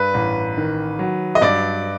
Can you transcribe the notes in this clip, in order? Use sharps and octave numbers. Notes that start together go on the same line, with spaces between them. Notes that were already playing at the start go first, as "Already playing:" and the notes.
Already playing: G2 B4
A1
D#3
F#3
D#5
G2 D5